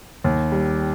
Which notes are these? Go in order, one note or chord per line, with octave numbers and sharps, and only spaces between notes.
D#2
G3